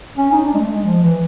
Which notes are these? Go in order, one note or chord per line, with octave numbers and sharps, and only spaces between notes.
C#4
D#4
D4
G#3
A3
G#3
F3
E3